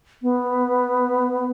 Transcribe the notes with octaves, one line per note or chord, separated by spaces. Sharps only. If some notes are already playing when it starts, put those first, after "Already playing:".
B3